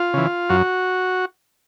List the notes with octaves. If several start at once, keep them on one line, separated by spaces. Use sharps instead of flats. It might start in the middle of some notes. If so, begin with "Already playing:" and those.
Already playing: F4
C#3 E3
F#2 F#4